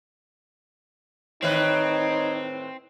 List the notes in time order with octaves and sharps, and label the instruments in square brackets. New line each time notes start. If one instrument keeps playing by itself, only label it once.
[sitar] A2 D#3 B4 [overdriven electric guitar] C4 [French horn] D#4 [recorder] C#5